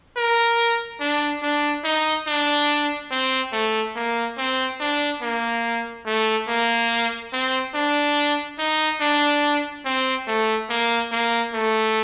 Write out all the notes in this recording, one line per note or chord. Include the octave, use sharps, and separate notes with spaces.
A#4
D4
D4
D#4
D4
C4
A3
A#3
C4
D4
A#3
A3
A#3
C4
D4
D#4
D4
C4
A3
A#3
A#3
A3